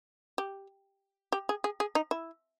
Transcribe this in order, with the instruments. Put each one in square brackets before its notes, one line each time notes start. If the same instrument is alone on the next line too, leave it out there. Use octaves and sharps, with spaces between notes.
[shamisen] G4
G4
G#4
G#4
G#4
D#4
E4